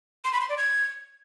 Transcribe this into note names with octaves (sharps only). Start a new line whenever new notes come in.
C6
B5
C6
D5
G#6